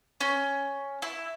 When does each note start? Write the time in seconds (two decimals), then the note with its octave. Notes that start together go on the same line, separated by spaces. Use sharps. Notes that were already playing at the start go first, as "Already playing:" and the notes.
0.21 C#4
1.02 E4